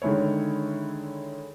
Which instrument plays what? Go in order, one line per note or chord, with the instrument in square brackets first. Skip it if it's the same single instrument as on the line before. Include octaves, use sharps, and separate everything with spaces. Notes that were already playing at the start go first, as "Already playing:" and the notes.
[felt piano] D3 D#3 G#3 E4 C#5